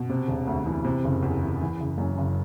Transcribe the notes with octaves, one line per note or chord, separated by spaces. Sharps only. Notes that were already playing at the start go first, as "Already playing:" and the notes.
Already playing: B2
C3
E1
D2
E3
C3
F#1
E2
E3
E3
F#1
F#2
F#1